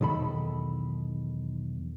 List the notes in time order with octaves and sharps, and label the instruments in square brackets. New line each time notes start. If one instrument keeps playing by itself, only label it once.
[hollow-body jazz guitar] B1 E2 D#3 A4 B5